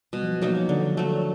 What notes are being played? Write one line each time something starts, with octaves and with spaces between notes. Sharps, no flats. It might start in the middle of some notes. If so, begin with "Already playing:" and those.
B2 G3
F3
F#3
F#3 A#3 D#4
F3
D3
F#3 A3